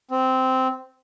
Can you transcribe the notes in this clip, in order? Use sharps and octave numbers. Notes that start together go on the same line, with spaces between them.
C4